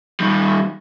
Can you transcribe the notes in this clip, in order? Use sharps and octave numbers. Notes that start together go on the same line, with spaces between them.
D#3 G3